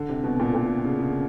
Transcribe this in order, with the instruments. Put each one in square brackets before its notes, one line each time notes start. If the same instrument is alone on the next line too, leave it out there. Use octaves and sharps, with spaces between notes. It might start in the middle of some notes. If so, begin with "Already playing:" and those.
Already playing: [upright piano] D3
C3
B2
A#2
A#2
C#3
C#3